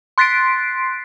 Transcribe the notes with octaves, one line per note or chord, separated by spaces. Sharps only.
C6 F#6 A6 B6 C7 D7